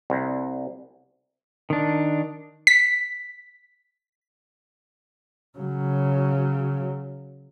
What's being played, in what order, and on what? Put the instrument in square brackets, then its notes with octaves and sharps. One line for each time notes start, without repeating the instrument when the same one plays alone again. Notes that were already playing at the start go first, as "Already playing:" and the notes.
[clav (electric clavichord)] C2
[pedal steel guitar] D#3 D4
[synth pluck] B6
[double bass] C#3 F#3